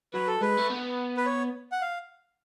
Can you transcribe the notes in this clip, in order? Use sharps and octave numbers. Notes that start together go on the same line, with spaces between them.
F#3 B4
A4
G#3 B4
A3
B3
B4
C#5
F#5
F5